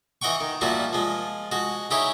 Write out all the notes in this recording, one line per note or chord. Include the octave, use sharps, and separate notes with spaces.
E3 D#5 F#5 G5 C#6
D#3
A#2 F3 G3 E4 F#4
F3 G#3
G#3 F#4
D#4 E4 G4 G#4 C#5 C#6